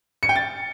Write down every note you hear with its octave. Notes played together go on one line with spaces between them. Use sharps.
C#7
G5
A6